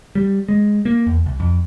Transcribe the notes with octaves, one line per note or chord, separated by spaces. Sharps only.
G3
G#3
A#3
E2
C2
F2